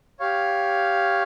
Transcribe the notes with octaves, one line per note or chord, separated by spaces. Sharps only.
G4 C#5 F5